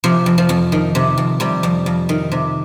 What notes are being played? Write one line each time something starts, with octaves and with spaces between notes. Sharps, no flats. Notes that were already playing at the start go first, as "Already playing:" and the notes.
C3 F3
F2
F3
F2
D#3
C3
F2
C3 G3
F2
F2
D#3
C3